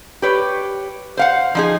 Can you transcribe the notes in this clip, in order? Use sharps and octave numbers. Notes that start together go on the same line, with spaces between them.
G4 B4 C#5
C5 F5 F#5
F3 D#4 G#4